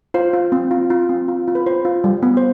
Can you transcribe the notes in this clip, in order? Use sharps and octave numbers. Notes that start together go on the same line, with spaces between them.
F4 C5
F4
C4
F4
F4
C4
F4
F4
B4
F4 C5
F4
G3
B3
C5